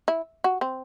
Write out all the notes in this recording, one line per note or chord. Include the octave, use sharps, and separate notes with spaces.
E4
F#4
C4